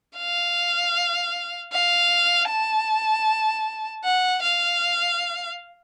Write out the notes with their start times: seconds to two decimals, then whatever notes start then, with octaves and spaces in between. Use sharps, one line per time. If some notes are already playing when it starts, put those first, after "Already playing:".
0.18 F5
1.73 F5
2.49 A5
4.04 F#5
4.43 F5